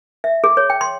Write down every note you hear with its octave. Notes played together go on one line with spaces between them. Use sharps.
E5
G#4
C#5
G5
C6